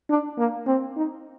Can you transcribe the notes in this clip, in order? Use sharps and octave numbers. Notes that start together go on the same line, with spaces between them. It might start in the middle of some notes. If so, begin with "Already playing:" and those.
D4
A#3
C4
D#4